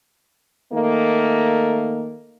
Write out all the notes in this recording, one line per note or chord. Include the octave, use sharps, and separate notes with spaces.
D#3 A3 A#3